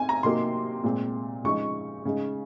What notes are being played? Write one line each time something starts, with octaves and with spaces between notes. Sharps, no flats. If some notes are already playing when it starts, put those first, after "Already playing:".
Already playing: C4 D#4 G#5
A#5
C3 F#3 A#3 D#4 C6
A#2 G#3 C4
C#3 F3 G#3 D#4 C#6
C#3 G#3 D#4